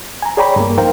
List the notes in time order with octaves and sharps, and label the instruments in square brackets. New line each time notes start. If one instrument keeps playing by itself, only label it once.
[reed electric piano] G#5 A#5
G#4 C#5 D5 G5 A#5 B5
G2 A#3
F2 D#4 A#4 C5 F5 G5